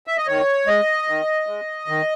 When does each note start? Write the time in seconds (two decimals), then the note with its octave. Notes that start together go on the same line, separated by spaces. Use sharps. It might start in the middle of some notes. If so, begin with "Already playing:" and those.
0.07 E5
0.17 D#5
0.27 D#3 C#5
0.67 G#3 D#5
1.08 D#3
1.47 G#3
1.88 D#3